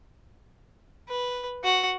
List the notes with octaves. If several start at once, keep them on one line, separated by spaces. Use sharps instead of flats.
B4
F#4 F#5